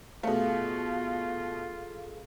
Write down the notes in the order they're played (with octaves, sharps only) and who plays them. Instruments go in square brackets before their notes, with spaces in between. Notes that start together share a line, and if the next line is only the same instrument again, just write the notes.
[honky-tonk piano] B2 A3 [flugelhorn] F4 [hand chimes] G#4 A4 F5